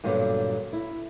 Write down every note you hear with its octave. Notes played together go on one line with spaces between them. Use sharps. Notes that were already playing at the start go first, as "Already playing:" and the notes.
G2 A#2 D3 F#3 B3
E4